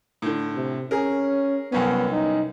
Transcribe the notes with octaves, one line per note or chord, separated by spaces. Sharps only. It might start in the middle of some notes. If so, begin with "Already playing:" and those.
A2 D3
C3
C#4 G#4 A#4
C2 F#2 B3 C#4
D#4